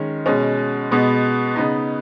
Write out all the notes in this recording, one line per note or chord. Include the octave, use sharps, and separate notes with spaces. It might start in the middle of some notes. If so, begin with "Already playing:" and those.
Already playing: D#3 G#3 C#4
B2 G#3 C#4
B2 G#3 B3
C#3 B3 D#4